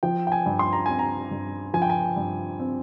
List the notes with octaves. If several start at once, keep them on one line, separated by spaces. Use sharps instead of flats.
F3 G5
G5
G#5
G2
C6
A#5
C4 G#5
A#5
G2
F3 G#5
G5
G#5
G2
C4